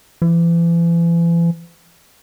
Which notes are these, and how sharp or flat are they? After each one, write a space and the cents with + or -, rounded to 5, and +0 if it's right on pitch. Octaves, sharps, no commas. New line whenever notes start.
E3 +40